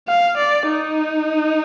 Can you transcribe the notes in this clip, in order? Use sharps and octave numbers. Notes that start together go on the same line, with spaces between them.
F5
D5
D#4